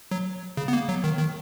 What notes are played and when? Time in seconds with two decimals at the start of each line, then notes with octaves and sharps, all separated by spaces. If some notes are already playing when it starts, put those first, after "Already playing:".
0.11 F#3
0.57 C#3
0.68 B3
0.73 A#3
0.89 F#3
1.04 D#3
1.19 D#3